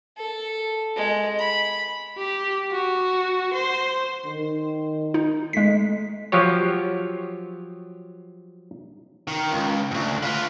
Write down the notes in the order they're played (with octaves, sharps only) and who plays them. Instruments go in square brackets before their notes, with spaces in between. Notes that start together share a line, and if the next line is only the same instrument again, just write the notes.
[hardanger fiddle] A4
G#3
B5
[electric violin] G4
F#4
C5
[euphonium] D#3
[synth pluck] D#4
[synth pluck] G#3 B6 [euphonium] A3
[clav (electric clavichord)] F3 F#3 G4 C#5
[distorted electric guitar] D#3
C#2
D2 G#2
F4 B4